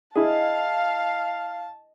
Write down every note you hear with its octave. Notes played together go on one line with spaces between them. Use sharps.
E4 G#4 D#5 F5 A5